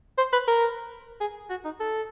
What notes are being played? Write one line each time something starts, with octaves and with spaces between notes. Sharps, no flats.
C5
B4
A#4
G#4
F#4
D#4
A4